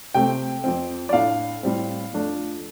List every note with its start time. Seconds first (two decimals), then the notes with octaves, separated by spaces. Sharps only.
0.14 C3 A3 C4 G5
0.64 F2 F3 C4
1.09 D5
1.13 A2 A3 D4 F5
1.63 A2 G3 C4
2.13 F2 F3 A3 D4